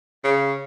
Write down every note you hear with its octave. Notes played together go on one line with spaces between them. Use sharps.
C#3